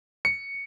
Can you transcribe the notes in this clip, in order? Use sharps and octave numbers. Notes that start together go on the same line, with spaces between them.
C#7